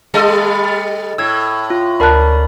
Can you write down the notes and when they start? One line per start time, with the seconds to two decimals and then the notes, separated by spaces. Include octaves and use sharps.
0.14 G3 A4 D#5
1.18 A2 E6 G#6
1.70 F4
2.00 D2 A#4 D5 A5 B5 F#6